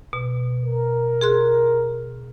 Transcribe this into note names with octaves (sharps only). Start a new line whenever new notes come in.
B2
A#4
G#4 C6 F#6